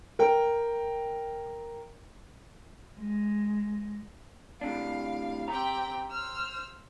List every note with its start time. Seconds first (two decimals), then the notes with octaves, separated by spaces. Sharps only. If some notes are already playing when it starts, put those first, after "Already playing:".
0.19 A#4 G5
2.99 G#3
4.61 A2 C3 D4 F5
5.48 C4 G4 G5 A#5
6.11 C5 E6 F6